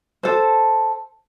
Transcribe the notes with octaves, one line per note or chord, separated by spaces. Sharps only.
A4 C5